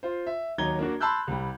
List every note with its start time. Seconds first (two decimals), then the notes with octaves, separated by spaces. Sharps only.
0.03 F4 C5
0.27 E5
0.58 D#2 F#3 D#4 A#5 G#6 G7
0.79 A#3 D4 F#4
1.00 A5 B5 C6 E6 F#6 G6
1.28 C2 G3